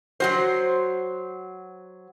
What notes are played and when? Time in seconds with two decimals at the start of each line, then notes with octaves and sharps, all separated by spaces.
0.20 F#3 F#4 C5